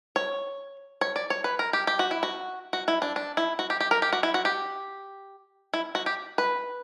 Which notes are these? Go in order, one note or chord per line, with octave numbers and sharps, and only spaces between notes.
C#5
C#5
D5
C#5
B4
A#4
G4
G4
F#4
E4
F#4
F#4
E4
D4
D4
E4
F#4
G4
G4
A#4
G4
F#4
E4
F#4
G4
E4
F#4
G4
B4